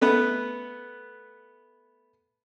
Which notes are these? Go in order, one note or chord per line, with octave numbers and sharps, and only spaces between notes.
A3 B3 B4